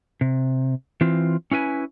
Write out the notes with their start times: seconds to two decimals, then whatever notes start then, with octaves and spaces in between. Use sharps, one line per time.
0.21 C3
1.01 E3 C4 F4
1.51 C#4 E4 B4 G#5